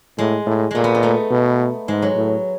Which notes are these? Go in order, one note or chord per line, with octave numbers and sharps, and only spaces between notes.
A2 G#3
A2
A#2 G#3 A3
B3
D#4
A3
B2
G#2 G#3
F#3
A2